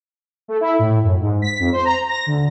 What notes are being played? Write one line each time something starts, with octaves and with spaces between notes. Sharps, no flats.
A3
E4
A2
F#2
G#2
B6
F2
C5
A#5
A#6
D2